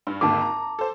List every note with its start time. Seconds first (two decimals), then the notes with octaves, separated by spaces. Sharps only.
0.07 G2
0.21 G#1 D#2 D3 A5 D6
0.41 A#5
0.79 A4 C5